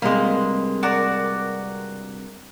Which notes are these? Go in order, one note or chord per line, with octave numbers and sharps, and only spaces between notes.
G2 C3 G#3 A#3
F#4 A#4 D5